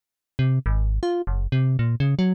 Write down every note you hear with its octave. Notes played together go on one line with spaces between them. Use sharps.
C3
G#1
F4
F#1
C3
A#2
C#3
F#3